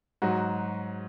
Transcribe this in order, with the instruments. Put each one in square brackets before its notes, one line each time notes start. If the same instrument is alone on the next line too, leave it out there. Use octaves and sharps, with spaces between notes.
[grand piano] G#2 F#3 F#4